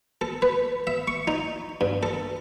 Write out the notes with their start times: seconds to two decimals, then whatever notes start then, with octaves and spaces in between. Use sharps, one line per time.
0.21 A4
0.42 B4
0.87 E5
1.08 C#6
1.28 D#4
1.81 G2
2.03 A4